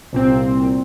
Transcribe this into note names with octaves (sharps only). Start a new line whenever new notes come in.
C2 A#2 C4